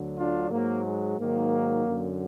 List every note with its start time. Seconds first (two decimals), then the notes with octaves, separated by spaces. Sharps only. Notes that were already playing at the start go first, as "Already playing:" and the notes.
Already playing: D2 D3 F#3
0.17 D4 F4
0.51 G#2 F#3 A#3
0.85 G#3
1.19 G#2 D#3 F#3 A#3
1.86 F#2 D3 F#3